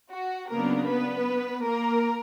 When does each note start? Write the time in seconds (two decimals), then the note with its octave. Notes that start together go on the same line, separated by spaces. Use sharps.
0.11 F#4
0.50 C#3 F#3 A#3 B3 D4 A#4
0.88 B3 B4
1.66 A#3 A#4